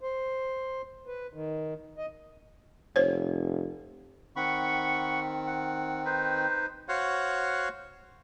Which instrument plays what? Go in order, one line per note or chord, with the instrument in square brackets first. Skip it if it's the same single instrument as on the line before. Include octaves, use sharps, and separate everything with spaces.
[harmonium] C5
B4
D#3
D#5
[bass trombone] F1 [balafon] C5 C#5
[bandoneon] D#3 C4 [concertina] F#5 B5 C#6
[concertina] F#5
D#4 B4 C5
F#4 C5 C#5 F5 F#5